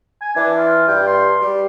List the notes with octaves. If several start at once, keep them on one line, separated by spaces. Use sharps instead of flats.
G#5
E3 D4
F4
G2 G5
C6
G3